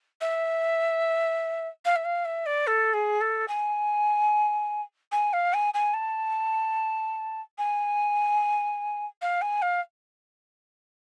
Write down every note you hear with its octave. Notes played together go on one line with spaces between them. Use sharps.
E5
F5
E5
F5
E5
D5
A4
G#4
A4
G#5
G#5
F5
G#5
G#5
A5
G#5
F5
G#5
F5